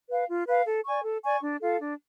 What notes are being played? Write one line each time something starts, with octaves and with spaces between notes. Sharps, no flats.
B4 F5
F4
B4 F5
A4
D5 G#5 C#6
A4
D5 G#5 C#6
D4
F4 A4 F5
D4